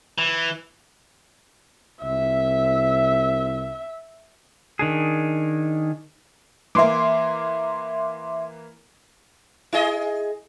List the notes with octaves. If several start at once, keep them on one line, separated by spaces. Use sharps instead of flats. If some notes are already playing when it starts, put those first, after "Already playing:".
E3
C2 E5
D#3 D4 G#4
E3 A#3 E5 C6 D6
E4 G#4 D#5